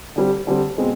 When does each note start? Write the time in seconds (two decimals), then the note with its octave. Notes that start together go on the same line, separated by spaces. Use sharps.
0.16 D3 G3 C4
0.47 D3 G3 C4
0.78 B2 G#3 C4